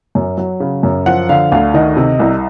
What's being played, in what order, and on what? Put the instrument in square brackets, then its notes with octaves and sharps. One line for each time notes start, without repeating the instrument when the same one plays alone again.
[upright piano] F#2
F#3
C#3
F#2
F3 F#5
D3 F5
D2 F5
D#3 D#5
C3
C2